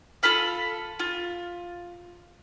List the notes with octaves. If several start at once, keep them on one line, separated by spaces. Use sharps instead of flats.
F4 A4 B5 F6
F4